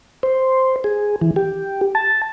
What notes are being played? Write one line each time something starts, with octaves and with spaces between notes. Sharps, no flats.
C5
G#4
E3
G4
A5